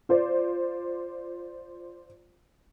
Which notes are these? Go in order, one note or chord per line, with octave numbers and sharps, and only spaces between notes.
F4 C5 D5